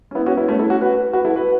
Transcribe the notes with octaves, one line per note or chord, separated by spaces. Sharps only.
C#4
B3 E4
C#4 F#4
B3 E4
A3 C#4
E4 A4
C#4 F#4
F#4 B4
F#4 B4
E4 A4
F#4 B4